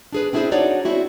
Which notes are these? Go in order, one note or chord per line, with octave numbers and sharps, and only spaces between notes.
D4 G#4 B4
C4 D4 E4 G4 G#4 C5
D4 D#4 F#4 C#5 D5
C4 E4 F#4